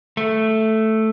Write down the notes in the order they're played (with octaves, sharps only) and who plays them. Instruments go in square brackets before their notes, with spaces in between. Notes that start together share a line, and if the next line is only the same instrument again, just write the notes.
[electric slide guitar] A3